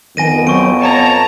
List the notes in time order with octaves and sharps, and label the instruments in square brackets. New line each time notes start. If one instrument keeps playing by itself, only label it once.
[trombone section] F2 B3 [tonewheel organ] D#3 [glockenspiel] G#5 A#6 D#7
[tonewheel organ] F#3 C4 [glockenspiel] C#6 D7
[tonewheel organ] C#5 [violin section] A5 A#5